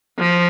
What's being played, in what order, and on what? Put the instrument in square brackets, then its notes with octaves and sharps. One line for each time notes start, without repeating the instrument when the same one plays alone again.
[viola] F3